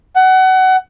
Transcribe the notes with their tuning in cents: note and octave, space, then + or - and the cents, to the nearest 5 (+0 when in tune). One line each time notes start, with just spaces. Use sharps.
F#5 +25